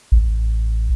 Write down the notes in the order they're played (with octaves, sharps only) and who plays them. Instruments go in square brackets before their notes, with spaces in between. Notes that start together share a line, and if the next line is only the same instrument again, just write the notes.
[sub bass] A1